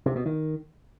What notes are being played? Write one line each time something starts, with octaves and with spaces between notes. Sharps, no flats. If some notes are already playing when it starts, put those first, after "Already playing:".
C3
B2
D#3